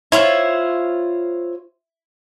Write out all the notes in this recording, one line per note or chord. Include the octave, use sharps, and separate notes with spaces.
E4 F4 C5 C#5